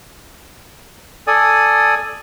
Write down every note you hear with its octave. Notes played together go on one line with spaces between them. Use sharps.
A4 D5 G#5 D#6